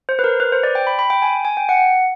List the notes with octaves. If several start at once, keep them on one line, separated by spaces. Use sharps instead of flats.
C5
B4
A#4
B4
C5
D5
G5
B5
B5
G5
G#5
G#5
G5
F#5